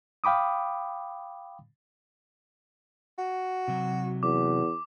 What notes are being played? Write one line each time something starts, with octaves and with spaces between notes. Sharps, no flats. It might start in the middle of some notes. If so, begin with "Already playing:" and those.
F5 G5 B5 D6 D#6
F#4
C3 F#3
E2 D6